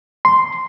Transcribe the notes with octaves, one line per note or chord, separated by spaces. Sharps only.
C6